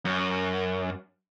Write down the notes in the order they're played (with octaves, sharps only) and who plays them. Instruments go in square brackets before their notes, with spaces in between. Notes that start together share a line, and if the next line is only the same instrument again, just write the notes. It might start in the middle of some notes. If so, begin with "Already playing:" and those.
[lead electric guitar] F#2